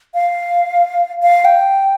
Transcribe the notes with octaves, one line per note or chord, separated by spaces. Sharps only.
F5
F5
G5